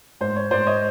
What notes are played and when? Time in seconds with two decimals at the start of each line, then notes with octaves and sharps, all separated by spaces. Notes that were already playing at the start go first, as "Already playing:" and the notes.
0.21 G#2 C5
0.36 C#5
0.51 G#2 C5 D5
0.67 C#5 D#5